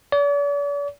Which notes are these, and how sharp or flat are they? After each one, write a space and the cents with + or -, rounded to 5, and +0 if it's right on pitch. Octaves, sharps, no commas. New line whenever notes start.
D5 -45